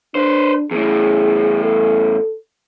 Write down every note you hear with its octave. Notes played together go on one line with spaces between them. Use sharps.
D4 B4 C5
E2 A2 G#4
A4